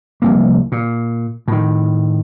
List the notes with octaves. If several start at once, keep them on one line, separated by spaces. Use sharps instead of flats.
F1 C2 A#3
A#2
A2 D#3